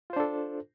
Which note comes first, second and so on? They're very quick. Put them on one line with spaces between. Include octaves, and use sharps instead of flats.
F4 C5 D4 A4